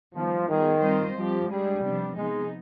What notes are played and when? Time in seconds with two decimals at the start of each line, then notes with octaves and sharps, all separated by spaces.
0.15 D#3 F3 G3 B3
0.48 D#3 G3 B3 F4 G#4
0.82 G3 C4 F4 C5 D#5
1.16 F3 G3 C4 G4
1.49 G3 G#3 D4 G#4
1.82 C3 F3 B3 D4
2.16 C3 F3 G#3 B3 D#4